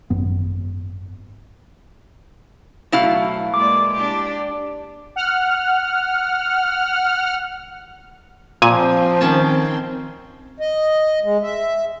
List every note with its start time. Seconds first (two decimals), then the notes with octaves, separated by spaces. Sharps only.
0.10 G#1 F#2 B3
2.92 B2 F#3 A3 E4 F5
3.54 G#3 A#3 D5 D6
3.93 D4 G4
5.16 F#5 F6
8.62 A#2 F3 C4 G5 G#5 C6
9.21 D#3 C#4 A5
10.60 D#5
11.23 G#3
11.43 E5